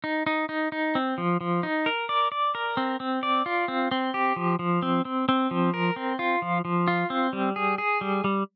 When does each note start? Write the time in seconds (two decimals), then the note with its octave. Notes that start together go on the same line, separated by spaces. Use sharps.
0.04 D#4
0.27 D#4
0.49 D#4
0.72 D#4
0.95 C4
1.18 F3
1.41 F3
1.63 D#4
1.86 A#4
2.09 D5
2.32 D5
2.55 A#4
2.77 C4
3.00 C4
3.23 D5
3.46 F4
3.68 C4
3.91 C4
4.14 G4
4.36 F3
4.59 F3
4.82 C4
5.05 C4
5.29 C4
5.51 F3
5.74 A#4
5.96 C4
6.19 F4
6.42 F3
6.65 F3
6.88 F4
7.10 C4
7.33 G3
7.56 G#4
7.78 G#4
8.01 G3
8.24 G3